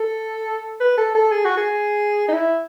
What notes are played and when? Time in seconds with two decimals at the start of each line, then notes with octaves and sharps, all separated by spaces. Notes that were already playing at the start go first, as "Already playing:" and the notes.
Already playing: A4
0.81 B4
0.97 A4
1.15 A4
1.31 G#4
1.45 F#4
1.57 G#4
2.28 D#4
2.32 E4